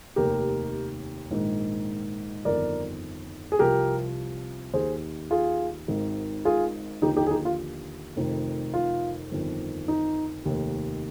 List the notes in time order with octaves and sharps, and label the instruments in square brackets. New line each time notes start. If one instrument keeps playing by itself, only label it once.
[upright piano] F1 D#2 D#3 G4 A#4
A#1 G#2 D#3
G1 F2 D#3 A#4 D5
G#4
C2 C3 F3 G4 A#4
D#2 D#3 G#4 C5
F4 G#4
G#1 G#2 D#3
F4 G#4
D#2 D3 F3 D#4 G4
D#4 G4
G#4
D#4 G4
F4
F1 F2 D#3
F4
G1 F2 D#3
D#4
F1 D#2 D#3